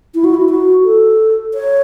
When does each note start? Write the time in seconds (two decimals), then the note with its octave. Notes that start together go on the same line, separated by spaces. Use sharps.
0.15 E4
0.24 F#4
0.34 E4
0.50 F#4
0.84 A4
1.54 C#5